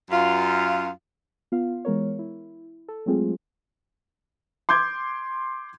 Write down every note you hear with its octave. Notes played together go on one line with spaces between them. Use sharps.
F#2 F4
B3 F4 F5
E3 G#3 B3 A#4 C#5
E4
A4
F#3 G#3 A3 C4 F4 G#4
C6 D6 G6 G#6